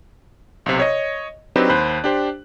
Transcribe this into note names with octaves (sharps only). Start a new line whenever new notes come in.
B1 C3
C#5 D#5
F#3 C4 D4 D#4 G4 B4
D#2 C5 B5 F#6
D4 G4 C5